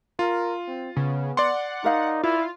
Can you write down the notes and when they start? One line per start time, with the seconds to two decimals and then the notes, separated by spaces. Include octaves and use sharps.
0.19 F4 A#4
0.67 C4
0.97 C#3 B3
1.37 D5 F#5 C6
1.84 D#4 A#4 F5
2.23 E4 F4